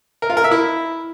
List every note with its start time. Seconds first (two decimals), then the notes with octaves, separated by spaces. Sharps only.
0.22 A#4
0.30 F4
0.37 A#4
0.44 E5
0.51 E4